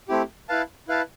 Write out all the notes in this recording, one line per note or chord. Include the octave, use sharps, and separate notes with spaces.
A3 C4 E4 G4
E4 B4 F5 A5
E4 B4 F5 A5